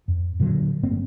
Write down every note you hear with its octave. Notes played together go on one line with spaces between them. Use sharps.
F2
A#2 D3 F#3
G1 A2 A#3 C4